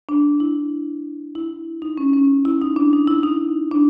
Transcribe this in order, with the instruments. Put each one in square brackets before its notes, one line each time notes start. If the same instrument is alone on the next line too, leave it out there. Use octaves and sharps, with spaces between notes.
[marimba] D4
E4
E4
D#4
C#4
C#4
E4
D#4
D4
D#4
E4
D#4
D4